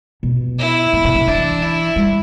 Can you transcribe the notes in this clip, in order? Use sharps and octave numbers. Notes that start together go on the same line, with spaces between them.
B2
E4
A2
B2
D3
E3 D4
E4
G3